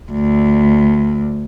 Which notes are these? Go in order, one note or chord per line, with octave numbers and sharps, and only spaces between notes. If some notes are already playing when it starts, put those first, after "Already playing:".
D2